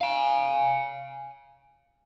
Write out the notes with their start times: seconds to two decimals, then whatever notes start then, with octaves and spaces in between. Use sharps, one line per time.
0.01 F5 G#5